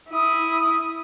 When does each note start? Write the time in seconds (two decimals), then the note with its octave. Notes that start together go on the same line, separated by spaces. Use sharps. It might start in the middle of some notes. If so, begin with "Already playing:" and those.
0.10 E4 D#6